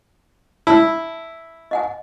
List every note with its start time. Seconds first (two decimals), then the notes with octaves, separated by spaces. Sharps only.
0.67 E4 A5
1.71 D#5 F#5 G#5